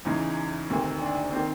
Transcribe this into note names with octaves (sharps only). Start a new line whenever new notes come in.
E2 C#3 E3 D#4
D2 C3 D#3
D4
D#3 C4